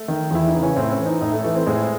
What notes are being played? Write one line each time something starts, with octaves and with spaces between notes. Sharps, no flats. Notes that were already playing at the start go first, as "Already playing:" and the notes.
Already playing: A3
D#3
E2 E4
D#4
C#3 E3
C#4
A2 C4
C#4
E3
D#4
A2 D#4
A3
E3 A3
C4
A2 G#3